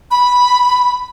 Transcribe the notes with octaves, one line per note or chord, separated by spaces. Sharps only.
B5